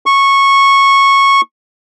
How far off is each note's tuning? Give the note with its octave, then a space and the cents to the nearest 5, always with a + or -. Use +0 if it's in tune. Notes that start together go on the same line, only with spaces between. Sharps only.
C#6 -15